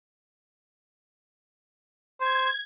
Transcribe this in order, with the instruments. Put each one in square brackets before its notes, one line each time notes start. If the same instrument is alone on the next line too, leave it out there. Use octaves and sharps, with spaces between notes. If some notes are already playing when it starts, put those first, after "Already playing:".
[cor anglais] C5 [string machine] G#6